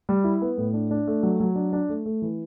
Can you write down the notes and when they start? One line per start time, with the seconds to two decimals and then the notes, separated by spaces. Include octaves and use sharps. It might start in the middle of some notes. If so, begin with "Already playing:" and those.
0.09 G3
0.24 E4
0.42 B3
0.57 A2
0.73 D4
0.91 D4
1.07 A3
1.23 F#3
1.40 F#3
1.56 D4
1.73 D4
1.89 A3
2.06 A3
2.22 E3